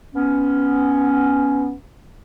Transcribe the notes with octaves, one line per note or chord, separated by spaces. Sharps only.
B3 C#4